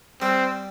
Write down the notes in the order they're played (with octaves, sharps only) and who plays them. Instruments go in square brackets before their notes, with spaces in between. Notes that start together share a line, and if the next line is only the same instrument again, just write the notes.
[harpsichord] G3 [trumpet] C4